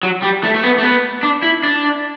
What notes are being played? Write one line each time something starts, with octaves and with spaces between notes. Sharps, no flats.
F#3
G3
A3
A3
B3
A3
B3
D4
E4
D4